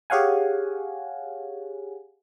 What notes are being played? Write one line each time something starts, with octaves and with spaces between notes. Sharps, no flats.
G4 G#4 C#5 F5 F#5 G#5